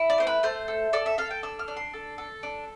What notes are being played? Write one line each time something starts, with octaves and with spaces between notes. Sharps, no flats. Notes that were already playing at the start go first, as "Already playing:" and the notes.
Already playing: E4
D5
A3 C5
B4
A3 C5
A4
A4 D5
E5
A4 F5
G5
D4 E6
F6
D4
C6
A4
A4
D4